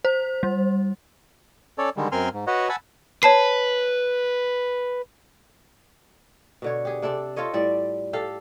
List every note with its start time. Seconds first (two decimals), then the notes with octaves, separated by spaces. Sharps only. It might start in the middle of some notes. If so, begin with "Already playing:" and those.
0.05 C5
0.43 G3
1.78 C#4 A4 C#5 D5
1.97 D3 D#3 G3 G#3
2.12 F#2 C4 A#4 G#5 C6 F6
2.33 G#2
2.47 F#4 B4 C#5 D#5 F#5
2.69 F#5 G#5 A5 B5 E6
3.23 B4 C#5 A5 C7
6.62 B2 D3 C#5
6.85 G4 G#4
7.02 C3 D4 A4 D5
7.36 F4 A4 C#5 D#5
7.54 A2 G3 D5
8.13 G4 A4 F5